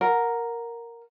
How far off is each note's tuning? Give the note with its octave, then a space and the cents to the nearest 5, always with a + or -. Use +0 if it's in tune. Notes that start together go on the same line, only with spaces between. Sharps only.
A#4 +0 F#5 -15